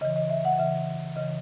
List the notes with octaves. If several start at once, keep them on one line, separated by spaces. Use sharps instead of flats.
C#3 E3 D#5
D#5
E5
F#5
C#3 E3 E5
C#3 D#5
E3